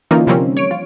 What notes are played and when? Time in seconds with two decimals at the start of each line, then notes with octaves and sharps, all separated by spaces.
0.11 D3 E3 A#3 C#4 D#4 F4
0.27 C3 F3 G3 A#3 C4 C#4
0.57 C#5 D7
0.71 F4